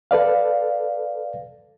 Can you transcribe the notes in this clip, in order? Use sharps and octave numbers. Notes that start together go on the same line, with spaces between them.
A4 B4 D5 F5